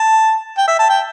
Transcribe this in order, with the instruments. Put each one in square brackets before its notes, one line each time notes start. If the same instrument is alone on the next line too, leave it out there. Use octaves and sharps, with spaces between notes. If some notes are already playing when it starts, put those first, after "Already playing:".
Already playing: [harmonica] A5
G5
E5
A5
G5